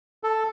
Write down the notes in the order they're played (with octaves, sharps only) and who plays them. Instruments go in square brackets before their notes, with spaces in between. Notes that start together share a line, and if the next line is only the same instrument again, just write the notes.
[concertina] A4